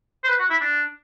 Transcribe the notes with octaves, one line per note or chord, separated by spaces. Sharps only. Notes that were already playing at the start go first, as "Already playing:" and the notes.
C5
B4
F#4
E4
D4